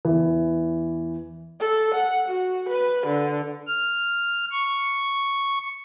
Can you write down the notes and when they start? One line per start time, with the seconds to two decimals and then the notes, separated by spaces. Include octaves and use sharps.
0.05 E2 E3
1.61 A4
1.95 F#5
2.29 F#4
2.69 B4
3.07 D3
3.67 F6
4.52 C#6